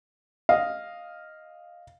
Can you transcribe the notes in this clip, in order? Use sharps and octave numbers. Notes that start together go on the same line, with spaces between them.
D#5 F5